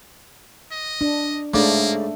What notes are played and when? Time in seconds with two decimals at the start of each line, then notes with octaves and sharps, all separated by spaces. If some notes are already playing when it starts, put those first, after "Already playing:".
0.72 D#5
1.01 D4
1.54 G#2 C#3 A3 A#3 D4 D5